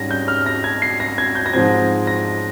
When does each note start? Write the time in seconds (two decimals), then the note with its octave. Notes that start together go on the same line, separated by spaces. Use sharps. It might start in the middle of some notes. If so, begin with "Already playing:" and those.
Already playing: G#2 G3 C#4 A#6
0.11 G6
0.28 F6
0.46 A#6
0.64 G#6
0.82 C7
1.00 A#6
1.18 G#6
1.35 G6
1.46 A#6
1.53 G#2 F3 C4 G#6
2.07 A#6